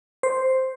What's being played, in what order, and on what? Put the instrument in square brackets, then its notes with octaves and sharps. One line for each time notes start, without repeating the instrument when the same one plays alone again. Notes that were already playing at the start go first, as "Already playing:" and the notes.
[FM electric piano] C5